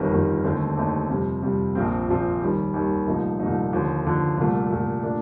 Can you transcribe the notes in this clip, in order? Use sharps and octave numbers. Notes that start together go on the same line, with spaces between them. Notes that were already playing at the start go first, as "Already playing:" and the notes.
Already playing: G1 F2 D#3 G3
G1 F2 D#3 G3
D#2 D3 A3 C4 D#4
D#2 D3 A3 C4 D#4
F2 C3 G3
F2 C3 G3
A#1 A#2 F3 C4
A#1 A#2 F3 C4
D#2 D#3 G3
D#2 D#3 G3
C2 A#2 F3 A3 D#4
C2 A#2 F3 A3 D#4
D#2 D3 F3
D#2 D3 F3
C2 A#2 A3
C2 A#2 A3
A#2 A3 D4